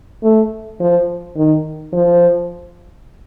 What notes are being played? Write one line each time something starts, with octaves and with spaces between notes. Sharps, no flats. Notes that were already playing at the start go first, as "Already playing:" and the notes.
A3
F3
D#3
F3